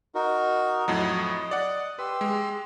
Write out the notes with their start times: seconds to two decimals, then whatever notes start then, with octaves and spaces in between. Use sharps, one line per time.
0.15 D#4 F#4 A#4
0.88 F2 A2 F#3 D#5
1.51 D5 F#5
1.99 G4 B4 C6 E6
2.21 G#3